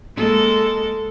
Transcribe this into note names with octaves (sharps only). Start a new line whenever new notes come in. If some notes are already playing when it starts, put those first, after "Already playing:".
G#3 A#3 A4